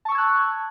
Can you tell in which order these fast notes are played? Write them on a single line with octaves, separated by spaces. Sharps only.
A5 C#6 E6 G#6 F#6